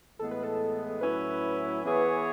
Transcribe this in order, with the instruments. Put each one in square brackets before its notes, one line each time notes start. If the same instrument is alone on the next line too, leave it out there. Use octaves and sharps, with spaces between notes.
[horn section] A2 E3 G#3 B3 [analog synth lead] A4
[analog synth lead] B4
A4
[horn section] A2 F#3 C#4 E4 [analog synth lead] B4
[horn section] E3 B3 E4 G#4 C#5